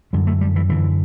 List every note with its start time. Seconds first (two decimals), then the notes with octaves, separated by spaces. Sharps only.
0.13 F#2 D3 G3
0.27 A3
0.41 G3
0.56 E3
0.69 F#2 D3 E3